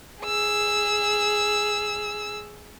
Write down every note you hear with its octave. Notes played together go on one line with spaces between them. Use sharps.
G#4 E6